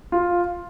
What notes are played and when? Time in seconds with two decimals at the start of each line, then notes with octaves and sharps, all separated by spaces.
0.12 F4